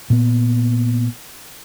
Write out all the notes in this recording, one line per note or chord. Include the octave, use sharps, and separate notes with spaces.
A#2 B3